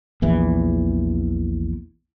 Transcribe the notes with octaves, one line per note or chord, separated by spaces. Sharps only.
A#1 E2 E3